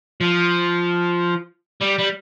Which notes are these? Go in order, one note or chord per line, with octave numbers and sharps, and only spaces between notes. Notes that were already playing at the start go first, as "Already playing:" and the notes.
F3
G3
G3